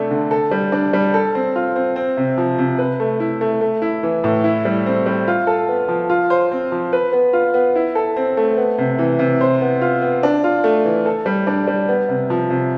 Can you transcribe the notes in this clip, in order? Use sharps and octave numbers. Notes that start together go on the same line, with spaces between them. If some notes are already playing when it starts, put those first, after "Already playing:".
Already playing: C3 A3 D4 A4
D3
A4
G3
D4
G3
A4
C4
F4
C4
C4
C3
F3
C3
B4
A3
E4
A3
A3
E4
E3
A2
E4
G3
C4
G3
F4
A4
B3
F3
F4
C5
C4
F3
B4
B3
F4
B3
E4
A4
C4
A3
B3
C3
E3
C3
C5
B3
F4
B3
D4
F4
A3
E3
A4
G3
D4
G3
B3
C3
F3
C3